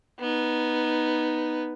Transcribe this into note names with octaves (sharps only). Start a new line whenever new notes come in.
B3 D#4